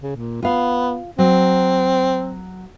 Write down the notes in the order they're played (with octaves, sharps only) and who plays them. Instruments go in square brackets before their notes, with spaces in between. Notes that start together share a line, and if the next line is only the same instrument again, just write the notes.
[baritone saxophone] C#3
A#2
[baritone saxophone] B3 [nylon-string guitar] F4 F5
[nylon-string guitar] F#3 [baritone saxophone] C4